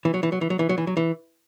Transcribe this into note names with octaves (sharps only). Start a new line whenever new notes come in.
E3
F#3
E3
F#3
E3
F#3
E3
F#3
E3
F#3
E3